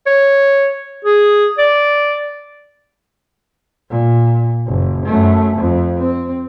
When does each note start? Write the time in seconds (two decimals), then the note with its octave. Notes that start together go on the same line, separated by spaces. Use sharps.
0.06 C#5
1.05 G#4
1.58 D5
3.90 A#2
4.67 F#1
5.06 F#2 A3
5.56 F2
5.99 C4